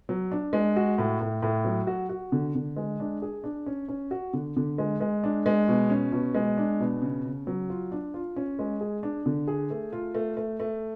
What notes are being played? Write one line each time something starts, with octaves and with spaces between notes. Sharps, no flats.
F#3
D4
G#3
F#4
A2
A2
A2
F#3
F#4
F#4
D3
D3
G#3
D4
G#4
D4
C#4
C#4
F#4
D3
D3
G#3
G#3
D4
G#3
B2
C#4
B2
G#3
D4
B2
C#3
C#3
F#3
F4
D4
F4
C#4
G#3
G#4
D4
D3
G#4
A3
F4
A3
A3
A3